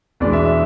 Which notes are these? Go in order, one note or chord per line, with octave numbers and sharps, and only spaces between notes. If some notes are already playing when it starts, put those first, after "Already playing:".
E2 B2 G#3 D4 D5
E5
E5